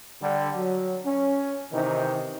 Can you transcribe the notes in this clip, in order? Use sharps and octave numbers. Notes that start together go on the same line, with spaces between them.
D3 G3
F#3
C#4
C3 D#3 E3 D#4